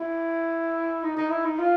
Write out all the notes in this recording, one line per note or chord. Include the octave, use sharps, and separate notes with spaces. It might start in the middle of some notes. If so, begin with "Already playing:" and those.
Already playing: E4
D#4
D#4
E4
D#4
F4